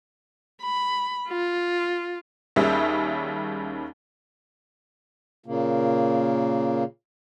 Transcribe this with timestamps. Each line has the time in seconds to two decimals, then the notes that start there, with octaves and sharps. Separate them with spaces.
0.63 B5
1.28 F4
2.56 D#2 D#3 G3 C#4 G#4 E5
5.46 A#2 C#3 A#3